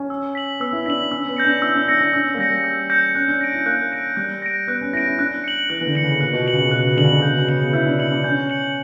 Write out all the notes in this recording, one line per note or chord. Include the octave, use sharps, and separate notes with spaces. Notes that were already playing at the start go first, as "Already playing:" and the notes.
Already playing: C#4
E6
B6 F#7
B3 E6
E4
D4 B6 F#7
C#4 E6
B3
G6 A#6 C#7
D4
E4 E6
D4
E4 G6 A#6 C#7
D4
C#4 E6
A#3
G3 G6 A#6 C#7
E6
G6 A#6 C#7
C#4 F#6
D4
A#6 D7
E4
A#3 F#6
A#6 D7
G3 F#6
A#6 D7
B3 F#6
C#4
E4 A#6 D7
E4
D4 F#6
C#7 F#7
E3 F#6
E3
D3
C#7 F#7
C#3
A#2 F#6
B2
C#7 F#7
C#3
B2
B2 F#6
C#3
D3 C#7 F#7
C#3
B2
B2 G6
C#3
C#3 C#7 F#7
B3
E4 G6
D4
E4 C#7 F#7
D4
C#4 G6
C#7 F#7